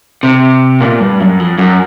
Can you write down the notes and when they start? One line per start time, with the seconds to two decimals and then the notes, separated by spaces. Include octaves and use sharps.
0.23 C3
0.81 A#2
1.00 G2
1.20 F#2
1.40 F2
1.58 F#2